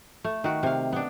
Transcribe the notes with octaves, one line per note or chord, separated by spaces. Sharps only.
A3
D#3 F#4
C3 F5
B3 D4